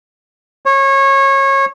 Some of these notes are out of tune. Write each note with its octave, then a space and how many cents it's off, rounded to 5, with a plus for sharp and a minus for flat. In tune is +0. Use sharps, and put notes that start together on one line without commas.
C#5 -25